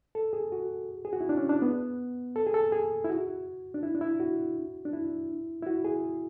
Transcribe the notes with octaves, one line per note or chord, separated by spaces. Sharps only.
A4
G#4
F#4
G#4
F#4
E4
D4
C#4
D4
B3
A4
G#4
A4
G#4
E4
F#4
D4
E4
D4
E4
F#4
D4
E4
E4
F#4
G#4